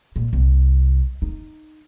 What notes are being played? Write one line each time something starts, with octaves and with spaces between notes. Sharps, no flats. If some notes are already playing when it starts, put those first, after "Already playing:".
A#2
C2
D#4